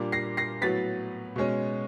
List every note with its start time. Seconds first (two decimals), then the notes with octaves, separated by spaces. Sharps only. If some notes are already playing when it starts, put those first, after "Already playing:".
Already playing: A#2 G3 A#3 D4
0.12 A#6 C7
0.37 A#6 C7
0.61 A2 F#3 B3 A6 B6
1.36 B2 G#3 C#4